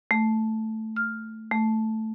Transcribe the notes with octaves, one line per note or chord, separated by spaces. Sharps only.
A3
F6
A3